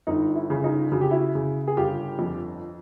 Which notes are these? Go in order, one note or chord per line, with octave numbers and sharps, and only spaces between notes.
G1 D#4
E4
C#3
D#4 F4
C#3 F#4
G4
E4 F#4
C#3
G#4
G1 F4 G4
F2